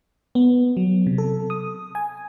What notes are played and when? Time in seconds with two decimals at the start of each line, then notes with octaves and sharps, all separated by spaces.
0.35 B3
0.77 F#3
1.07 C3
1.18 A4
1.50 D#6
1.95 G#5